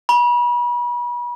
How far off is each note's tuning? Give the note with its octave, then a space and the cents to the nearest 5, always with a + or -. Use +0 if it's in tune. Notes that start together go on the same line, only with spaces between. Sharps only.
B5 -35